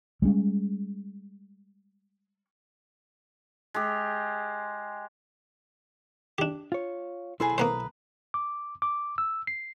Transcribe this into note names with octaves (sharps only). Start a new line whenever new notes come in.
G3 G#3 C4 C#4
G#3 G4
D4 G4
F4 C#5
B1 E4 G#4 A4 B4 C5
A#3 B3 B4 C5 A#5 D#6
D6
D6
E6
C7